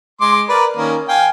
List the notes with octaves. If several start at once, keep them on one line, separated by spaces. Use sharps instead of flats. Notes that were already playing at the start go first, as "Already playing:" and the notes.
G#3 C6 D6
A#4 B4 D5
D#3 A#3 C#4
F5 G5 G#5